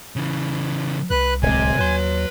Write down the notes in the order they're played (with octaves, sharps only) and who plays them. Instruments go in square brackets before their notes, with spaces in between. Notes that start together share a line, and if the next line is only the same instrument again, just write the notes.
[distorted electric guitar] C#3 E3
[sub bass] C2 [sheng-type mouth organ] B4 F#6
[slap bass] D1 G#3 [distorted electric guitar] C3 [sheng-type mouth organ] G#5
[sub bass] D#2 [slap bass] F#3 [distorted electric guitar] B4 C6